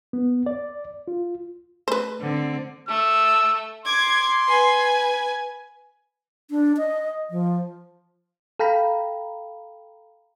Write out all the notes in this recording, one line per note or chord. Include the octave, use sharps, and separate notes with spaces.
B3
D5
F4
A3 B4 C5
D3 C4
A3 E6
C6 D6 G#6
B4 G#5
D4
D#5
F3
A4 F5 G5 A#5 B5